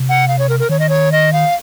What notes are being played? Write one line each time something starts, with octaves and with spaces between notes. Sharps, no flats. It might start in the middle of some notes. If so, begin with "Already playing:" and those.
Already playing: C3
F#5
F5
C#5
A#4
A#4
D#3 C#5
D#5
C#5
D#5
F5